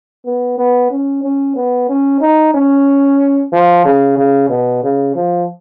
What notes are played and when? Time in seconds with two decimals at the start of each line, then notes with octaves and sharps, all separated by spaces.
0.26 B3
0.58 B3
0.91 C#4
1.24 C#4
1.56 B3
1.89 C#4
2.21 D#4
2.54 C#4
3.52 F3
3.85 C#3
4.17 C#3
4.50 B2
4.83 C#3
5.16 F3